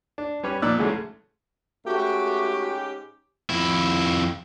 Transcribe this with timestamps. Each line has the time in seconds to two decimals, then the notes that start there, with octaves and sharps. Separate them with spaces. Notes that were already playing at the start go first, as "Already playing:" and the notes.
0.18 D4
0.43 G3 C#4 G4 B4 C#5
0.62 A#2 F3 D5 E6 F#6
0.78 G#2 C#3 E3 F#3 G#3 A3
1.86 G#2 A3 C#4 F#4 G4
3.50 F2 E4